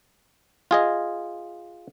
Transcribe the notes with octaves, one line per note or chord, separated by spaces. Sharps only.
F4 G#4 D#5